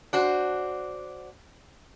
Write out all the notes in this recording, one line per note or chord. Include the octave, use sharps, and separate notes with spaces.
D4 F#4 C5